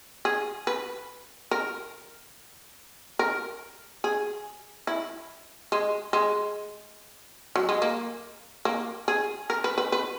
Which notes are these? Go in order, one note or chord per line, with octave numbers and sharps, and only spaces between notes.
G#4
B4
A#4
A#4
G#4
E4
G#3
G#3
F#3
G#3
A#3
A#3
G#4
A#4
B4
B4
B4